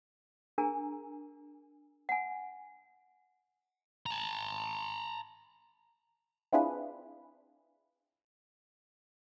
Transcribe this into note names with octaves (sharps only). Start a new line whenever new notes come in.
D4 G#4 A#4 G#5 A#5
F#5 G#5
A5 A#5
C4 D4 E4 F4 G#4 B4